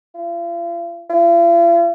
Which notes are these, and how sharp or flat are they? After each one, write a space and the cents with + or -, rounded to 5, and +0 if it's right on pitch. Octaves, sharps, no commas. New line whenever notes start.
F4 -40
F4 -45